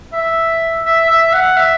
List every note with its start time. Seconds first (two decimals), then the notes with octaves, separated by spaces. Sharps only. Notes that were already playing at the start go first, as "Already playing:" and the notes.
0.13 E5
0.86 E5
1.10 E5
1.33 F#5
1.56 E5